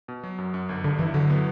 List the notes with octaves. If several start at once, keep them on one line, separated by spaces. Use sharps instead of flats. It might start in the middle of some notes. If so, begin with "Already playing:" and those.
B2
F#3
F#2
F#2
G1
G2 D3
E3 E4
D3 F#3
B3